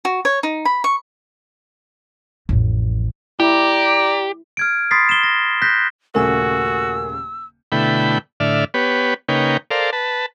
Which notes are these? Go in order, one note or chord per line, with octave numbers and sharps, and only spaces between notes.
F#4
C#5
D#4
B5
C#6
A1 F2
E4 G4 D5 A#5
F6 G#6 D7
B5 C6 D#6 A6 B6 C7
E7 G7
A#6
F#6 G6 A#6 B6
D#1 C#3 A3 F#4 A#4 G#5 E6
B2 D3 A3 E4 G5 B5
A2 D3 D5 E5 F6
B3 G4 B4 C#5
C#3 A#3 D#4 B4 C#5 G5
A4 A#4 C5 D5 F5
B4 A5